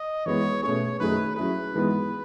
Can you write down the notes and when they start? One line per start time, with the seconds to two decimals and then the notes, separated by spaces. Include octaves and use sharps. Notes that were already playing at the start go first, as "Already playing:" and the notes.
Already playing: D#5
0.26 E3 G#3 B3 C#5
0.63 B2 A3 C#4 G#4 C#5
1.00 F#2 D#3 A3 D#4 G#4 B4
1.36 F#3 C#4 E4 G#4 B4
1.73 G#2 E3 G#3 B3